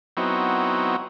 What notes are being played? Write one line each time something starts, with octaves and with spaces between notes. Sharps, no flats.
F#3 B3 C4 D#4 E4